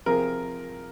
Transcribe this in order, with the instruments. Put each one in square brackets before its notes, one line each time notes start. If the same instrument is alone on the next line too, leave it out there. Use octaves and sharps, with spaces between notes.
[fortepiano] C3 F3 C4 F4 G#4 [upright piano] A#4